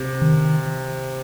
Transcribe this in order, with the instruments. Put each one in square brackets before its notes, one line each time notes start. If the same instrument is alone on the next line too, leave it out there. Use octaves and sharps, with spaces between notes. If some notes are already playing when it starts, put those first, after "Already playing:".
Already playing: [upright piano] C3
[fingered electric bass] D#3